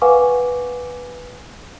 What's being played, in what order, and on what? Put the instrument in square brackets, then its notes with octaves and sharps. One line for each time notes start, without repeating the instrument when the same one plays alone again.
[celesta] B4 F5 F#5 G#5 C#6 D6